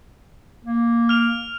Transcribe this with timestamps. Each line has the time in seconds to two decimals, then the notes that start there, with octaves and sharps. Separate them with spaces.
0.64 A#3
1.09 F6 F7